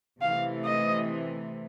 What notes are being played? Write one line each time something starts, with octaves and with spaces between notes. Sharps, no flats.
C3 E3 A3 F5
D#5